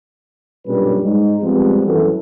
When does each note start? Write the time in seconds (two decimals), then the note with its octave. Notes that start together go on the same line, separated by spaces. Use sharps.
0.67 B1 G2 A#2 G3 C#4 B4
1.03 G#2 G#3 D#4
1.42 F3 G3 G#3 B3 C4
1.86 G#1 F#2 E3 F#4 A4 B4